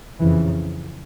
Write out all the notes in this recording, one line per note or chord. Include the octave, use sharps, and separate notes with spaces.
F2 C#3 E3